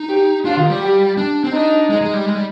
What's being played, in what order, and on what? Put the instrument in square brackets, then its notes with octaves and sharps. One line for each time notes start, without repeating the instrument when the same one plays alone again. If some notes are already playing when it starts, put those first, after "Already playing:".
Already playing: [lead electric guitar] D#4
[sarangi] G4
[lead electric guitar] D4 [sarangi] F4
[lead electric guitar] D#3
G3
[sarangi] G4
[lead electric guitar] D4
C4
[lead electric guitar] D4 [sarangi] D#4
[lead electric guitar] G#3
G#3
G3
G#3
G3